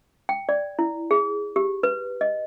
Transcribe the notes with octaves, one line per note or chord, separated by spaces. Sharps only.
G5
D5
E4
G#4
G4
B4
D#5